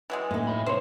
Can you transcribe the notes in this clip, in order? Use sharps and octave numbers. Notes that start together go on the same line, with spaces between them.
E3 F#3 G#3
A2 A#3 D#4
C#5 B5
C3 G3 C5 C#5